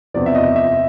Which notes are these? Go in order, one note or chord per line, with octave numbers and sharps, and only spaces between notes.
E2 C3 F3 D5
E5
D#5
E5